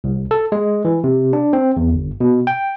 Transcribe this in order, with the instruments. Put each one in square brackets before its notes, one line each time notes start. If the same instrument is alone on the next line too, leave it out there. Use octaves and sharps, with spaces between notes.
[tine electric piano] C2
A4
G#3
E3
C3
D4
C4
E2
G1
B2
G5